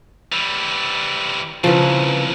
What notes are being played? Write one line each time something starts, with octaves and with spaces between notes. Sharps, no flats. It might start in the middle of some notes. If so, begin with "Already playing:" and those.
E3 G3
C2 A#2 C#3 E3 F3